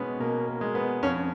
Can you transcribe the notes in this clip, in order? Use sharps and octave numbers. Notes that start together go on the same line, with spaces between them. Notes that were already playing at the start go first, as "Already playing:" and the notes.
Already playing: B2 G#3 B3 C#4
B2 A#3
A#3
G#3
B3
F2 C#4